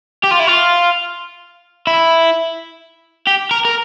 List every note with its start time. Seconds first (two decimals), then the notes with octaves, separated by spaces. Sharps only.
0.24 G4
0.31 F4
0.40 E4
0.48 F4
1.87 E4
3.27 G4
3.51 A#4
3.65 A#4